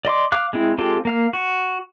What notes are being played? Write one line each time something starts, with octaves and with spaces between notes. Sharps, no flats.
D5 D#5 C6 D6
F5 D6 F6 F#6
G#3 C4 E4
G#3 C4 F4 G4 A4
A#3 F5 F6
F#4